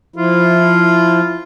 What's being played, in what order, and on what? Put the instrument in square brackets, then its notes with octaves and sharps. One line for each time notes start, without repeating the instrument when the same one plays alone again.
[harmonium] F3 E4 [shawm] F4